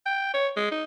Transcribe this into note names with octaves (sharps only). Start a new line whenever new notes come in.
G5
C#5
G#3
D#4